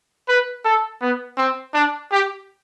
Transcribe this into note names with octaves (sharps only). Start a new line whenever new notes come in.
B4
A4
B3
C4
D4
G4